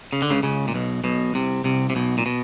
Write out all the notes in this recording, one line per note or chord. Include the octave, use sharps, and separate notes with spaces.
C#3
D3
C#2 C#3
C#2 C#3
A#2
B1 B2
B1 B2
C2 C3
C2 C3
C3
B1 B2
A#2
B2